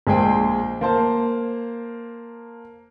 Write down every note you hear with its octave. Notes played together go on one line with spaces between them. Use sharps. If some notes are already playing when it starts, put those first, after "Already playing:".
A#1 G#3 G#4 C5 G5
A#3 C5 A5